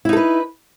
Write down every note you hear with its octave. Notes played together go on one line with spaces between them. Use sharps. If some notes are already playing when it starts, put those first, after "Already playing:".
D#4 E4 A4 B4